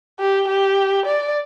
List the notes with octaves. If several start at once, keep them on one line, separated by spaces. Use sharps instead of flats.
G4
G4
D5